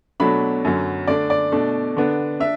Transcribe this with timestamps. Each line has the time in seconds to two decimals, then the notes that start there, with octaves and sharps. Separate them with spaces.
0.20 B2 F#3 A3 D4 B5
0.65 F#2 D3 F#3
1.07 D3 A3 D4 D5
1.30 D5
1.52 B2 A3 D4
1.96 D3 B3 D4
2.40 D4 E5